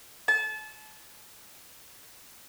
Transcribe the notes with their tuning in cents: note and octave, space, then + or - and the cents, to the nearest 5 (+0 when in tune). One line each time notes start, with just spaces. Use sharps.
A5 -30